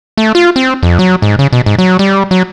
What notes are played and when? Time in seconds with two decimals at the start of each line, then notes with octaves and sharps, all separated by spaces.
0.17 A3
0.35 F4
0.56 C4
0.83 F2
0.99 F#3
1.22 G#2
1.39 C#3
1.53 B2
1.66 G#2
1.78 F#3
1.99 G3
2.31 F#3